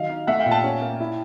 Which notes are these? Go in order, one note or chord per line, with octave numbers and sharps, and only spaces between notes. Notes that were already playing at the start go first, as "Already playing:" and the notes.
Already playing: D#3 F#3 D#5 F5
D#4
A3 E5 F#5
F5 G5
A#2
G5 A5
C#4
A#3
E4